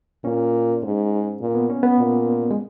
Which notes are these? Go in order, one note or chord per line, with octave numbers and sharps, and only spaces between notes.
A#2 C#4
G#2
A#2
B3
C#4
B3
A#2
G#3